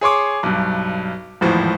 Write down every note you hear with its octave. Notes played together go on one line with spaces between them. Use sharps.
G#4 C#5 C6 D6
B1 G2
G#1 E2 A2 F3